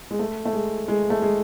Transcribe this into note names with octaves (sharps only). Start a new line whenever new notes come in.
G#3
A3
A3
G#3
G#3
A3
G#3